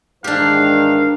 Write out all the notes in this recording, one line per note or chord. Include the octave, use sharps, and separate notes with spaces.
G#2 D#3 E3 D4 G4 F5